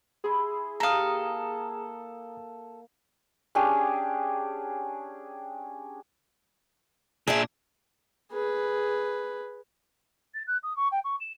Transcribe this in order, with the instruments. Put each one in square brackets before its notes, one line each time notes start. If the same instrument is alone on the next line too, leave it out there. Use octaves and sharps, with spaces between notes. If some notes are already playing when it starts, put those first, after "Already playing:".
[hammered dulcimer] E4 B5 C6 [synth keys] G#4
[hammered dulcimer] A#3 G4 [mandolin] A4 F5 [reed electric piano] A#5 D#6
[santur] C#4 D4 G4 G#4
[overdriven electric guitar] A#2 D4 [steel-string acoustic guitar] G#4 E5
[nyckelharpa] G#4 B4
[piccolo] A6
F#6
D#6
C#6
G5
C#6
E7